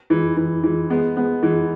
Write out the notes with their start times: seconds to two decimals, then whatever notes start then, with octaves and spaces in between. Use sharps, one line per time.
0.10 E3 G#3
0.37 E3
0.63 E3 G#3
0.90 G#3 B3
1.16 G#3 B3
1.43 E3 G#3